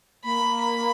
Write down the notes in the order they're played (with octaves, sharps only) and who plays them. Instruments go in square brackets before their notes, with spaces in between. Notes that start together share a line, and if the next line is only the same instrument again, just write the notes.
[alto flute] A#3 [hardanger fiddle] B5
[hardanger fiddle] B5